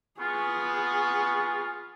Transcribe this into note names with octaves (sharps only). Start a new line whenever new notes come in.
B3 F4 G#4 C#6